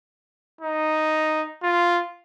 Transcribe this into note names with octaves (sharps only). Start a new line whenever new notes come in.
D#4
F4